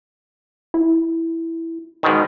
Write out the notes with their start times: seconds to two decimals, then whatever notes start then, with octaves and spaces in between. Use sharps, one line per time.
0.74 E4
2.03 G#2 B2 D#3